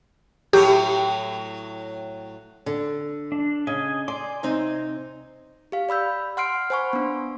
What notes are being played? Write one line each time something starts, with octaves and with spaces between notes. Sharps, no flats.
A2 F#3 G4
D3
D4
C#3 D#5 G#5
D5 G#5 C6 D6
C3 C4 D#4
G4 F5
D5 B5 E6 G6
F#5 C6 F6 C7 D7
C5 F#5 G#5 B5 C#6
B3 D4